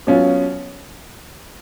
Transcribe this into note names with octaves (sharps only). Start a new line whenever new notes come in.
B2 F#3 C#4 F4